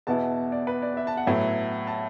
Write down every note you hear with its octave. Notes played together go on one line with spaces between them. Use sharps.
E2 B2 B3 E4 A5
D5
B4
D5
E5
A5
F#5
A2 F#3 B3 E4 E5
A5